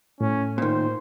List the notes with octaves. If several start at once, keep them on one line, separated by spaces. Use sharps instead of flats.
A2 C#4
A#2 D#3 C5